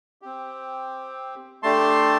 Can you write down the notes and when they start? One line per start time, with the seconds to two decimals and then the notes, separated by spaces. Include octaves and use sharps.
0.22 C4 G4
1.63 A3 D4 G4 A5 C6